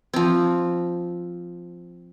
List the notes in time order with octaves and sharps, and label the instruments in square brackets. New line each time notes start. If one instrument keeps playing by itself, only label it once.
[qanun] F3 C4